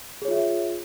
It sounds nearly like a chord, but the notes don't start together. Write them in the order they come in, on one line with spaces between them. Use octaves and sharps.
G#4 C#5 F4 E5